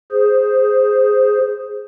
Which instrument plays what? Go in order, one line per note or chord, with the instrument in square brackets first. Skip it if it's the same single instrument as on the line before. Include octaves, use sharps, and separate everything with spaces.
[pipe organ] G#4 C5